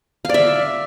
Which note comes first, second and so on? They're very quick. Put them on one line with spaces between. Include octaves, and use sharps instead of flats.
F5 D5 E5